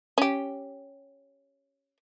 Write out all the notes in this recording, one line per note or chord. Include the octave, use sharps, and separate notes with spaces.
C#4 G4